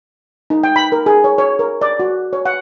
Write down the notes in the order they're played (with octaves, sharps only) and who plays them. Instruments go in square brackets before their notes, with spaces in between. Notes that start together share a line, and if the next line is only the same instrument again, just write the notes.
[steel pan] D#4
G5
B5
A#4
G#4
C#5
C#5
A#4
D5
F#4
C#5
F#5